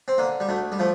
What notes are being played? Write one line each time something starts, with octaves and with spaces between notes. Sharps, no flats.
C4
D3 A#3
G3
D2 A3
G3
F3 A3